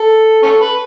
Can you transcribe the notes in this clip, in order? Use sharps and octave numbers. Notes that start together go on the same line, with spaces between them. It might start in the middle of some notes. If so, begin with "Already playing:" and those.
Already playing: A4
C#4 A4
B4